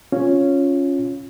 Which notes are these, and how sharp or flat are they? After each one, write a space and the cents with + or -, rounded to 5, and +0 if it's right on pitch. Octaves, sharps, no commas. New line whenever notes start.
C#4 +0 F4 +0